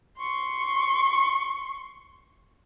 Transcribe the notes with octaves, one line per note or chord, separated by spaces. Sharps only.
C6 C#6